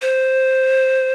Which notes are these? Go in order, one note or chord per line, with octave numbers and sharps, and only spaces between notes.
C5